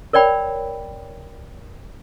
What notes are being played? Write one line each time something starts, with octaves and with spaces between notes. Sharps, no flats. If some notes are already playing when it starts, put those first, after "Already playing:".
A#4 C#5 D5 G5 B5